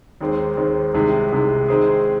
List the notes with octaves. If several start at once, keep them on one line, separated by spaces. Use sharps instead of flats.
D#2 D#3 G#3 C4
D#2 D#3 G#3 C4
C2 C3 D#3 G#3
C2 C3 D#3 G#3
D#3 G#3 C4 D#4 G#4